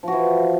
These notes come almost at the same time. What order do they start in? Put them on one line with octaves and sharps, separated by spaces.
F3 F#4 E3